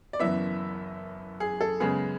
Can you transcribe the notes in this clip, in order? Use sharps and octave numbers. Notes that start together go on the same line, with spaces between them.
D5
F#1 F#2 E3 B3 E5
G#4
A4
F#2 C#3 G#3 B3 G#4